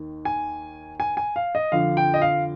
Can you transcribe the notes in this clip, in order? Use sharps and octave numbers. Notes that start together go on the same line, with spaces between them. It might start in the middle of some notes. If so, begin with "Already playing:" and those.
Already playing: D#2 D#3
G#5
G#5
G#5
F5
D#5
F2 D3 F3 F5
G5
D#5
F5